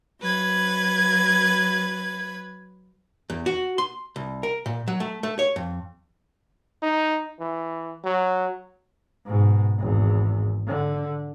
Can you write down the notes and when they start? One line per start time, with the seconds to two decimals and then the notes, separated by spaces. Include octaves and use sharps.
0.20 F#3 B4 G#6
3.30 E2
3.46 F#4
3.78 C6
4.16 C2
4.43 A#4
4.66 A#2
4.88 F#3
5.00 A3
5.23 A3
5.39 C#5
5.56 F2
6.83 D#4
7.40 E3
8.04 F#3
9.25 G#2 B2
9.78 G#1 E2
10.67 D3